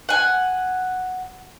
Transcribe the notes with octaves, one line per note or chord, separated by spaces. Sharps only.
F#5 G#5